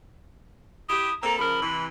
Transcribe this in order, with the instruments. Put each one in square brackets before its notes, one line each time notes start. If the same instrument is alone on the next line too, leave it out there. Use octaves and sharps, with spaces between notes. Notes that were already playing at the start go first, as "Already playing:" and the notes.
[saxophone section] E4 G4 [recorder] D#6
[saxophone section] A#3 C4 A4 [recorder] A#5
[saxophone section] C#3 F3 A#4 [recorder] B5
[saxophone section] C3 E3